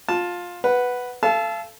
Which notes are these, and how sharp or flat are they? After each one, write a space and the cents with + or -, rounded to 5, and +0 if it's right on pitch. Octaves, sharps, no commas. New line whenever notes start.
F4 +15 A5 +0
B4 +0 F#5 +0
A4 +0 F5 -35 A5 -25